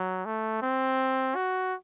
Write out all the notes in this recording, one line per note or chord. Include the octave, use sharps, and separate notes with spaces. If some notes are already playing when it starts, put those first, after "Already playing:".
Already playing: F#3
A3
C4
F#4